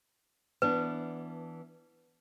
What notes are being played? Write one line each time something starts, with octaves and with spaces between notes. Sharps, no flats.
E3 B3 D4 B4